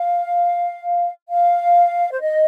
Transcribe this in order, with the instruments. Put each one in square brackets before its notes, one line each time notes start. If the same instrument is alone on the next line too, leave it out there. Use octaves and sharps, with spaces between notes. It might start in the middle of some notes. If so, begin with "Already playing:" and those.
Already playing: [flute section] F5
F5
C5
D#5